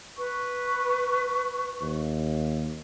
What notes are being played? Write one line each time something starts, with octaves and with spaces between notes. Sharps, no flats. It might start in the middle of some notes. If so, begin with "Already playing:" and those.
B4 C#6
D#2